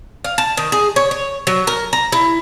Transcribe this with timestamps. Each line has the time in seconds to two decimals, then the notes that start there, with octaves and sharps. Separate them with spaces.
0.24 F5
0.38 A5
0.57 D#3
0.72 G#4
0.96 C#5
1.11 C#5
1.47 F#3
1.67 A#4
1.93 A#5
2.12 E4